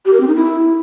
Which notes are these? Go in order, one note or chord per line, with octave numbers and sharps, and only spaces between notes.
G4
A#4
C4
D#4
E4